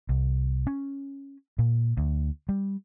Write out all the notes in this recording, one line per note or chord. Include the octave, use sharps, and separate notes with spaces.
C2
C#4
A#2
D2
G3